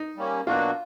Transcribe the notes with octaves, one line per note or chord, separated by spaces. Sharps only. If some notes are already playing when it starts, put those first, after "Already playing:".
Already playing: D#4
G3 A#3 C#4
B2 F#3 A#3 D4 F4 F#4